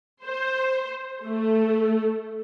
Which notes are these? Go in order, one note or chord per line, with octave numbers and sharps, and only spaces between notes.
C5
A3